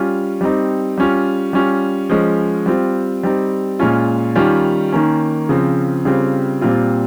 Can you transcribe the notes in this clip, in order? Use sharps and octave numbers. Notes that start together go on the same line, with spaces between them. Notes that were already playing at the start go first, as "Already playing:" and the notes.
Already playing: G3 C#4 F4
G3 C4 D#4
G3 C#4 F4
G3 C#4 F4
F3 G#3 C#4
G3 C4 F4
G3 C4 D#4
A#2 G#3 C#4 F4
D#3 G3 C#4 F4
D#3 A#3 C#4
C#3 F3 C4
C#3 G3 C4 F4
A#2 G3 C4 F4